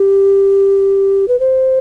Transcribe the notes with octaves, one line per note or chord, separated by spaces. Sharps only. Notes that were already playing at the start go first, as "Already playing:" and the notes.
Already playing: G4
B4
C5